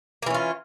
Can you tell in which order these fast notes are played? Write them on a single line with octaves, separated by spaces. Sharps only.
A#3 E3 C#4 F4